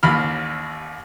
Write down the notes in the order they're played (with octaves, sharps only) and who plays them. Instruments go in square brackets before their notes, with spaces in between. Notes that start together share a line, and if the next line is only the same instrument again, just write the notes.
[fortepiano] A1 D#2 B5 F6